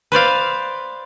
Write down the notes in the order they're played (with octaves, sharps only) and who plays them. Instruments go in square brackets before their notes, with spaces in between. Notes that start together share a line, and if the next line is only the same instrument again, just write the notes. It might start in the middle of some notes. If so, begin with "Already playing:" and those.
[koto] B4 C5 D5 F5